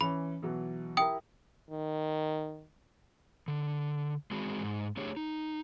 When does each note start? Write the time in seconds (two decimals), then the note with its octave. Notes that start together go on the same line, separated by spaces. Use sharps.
0.01 E3 C#4 B5
0.42 B2 E3 F#3
0.97 E4 G4 A#4 G5 D#6
1.70 D#3
3.48 D3
4.31 G#3 C4 F#4 G#4
4.64 G#2
4.97 A3 D4 G4 G#4 C#5
5.17 D#4